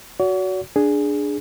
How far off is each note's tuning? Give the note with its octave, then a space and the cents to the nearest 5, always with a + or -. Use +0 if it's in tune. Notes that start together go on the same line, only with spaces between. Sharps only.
F#4 +0 C#5 +45
D4 +0 G#4 +0